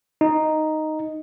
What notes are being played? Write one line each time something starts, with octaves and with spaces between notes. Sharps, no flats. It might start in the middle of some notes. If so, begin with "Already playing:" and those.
D#4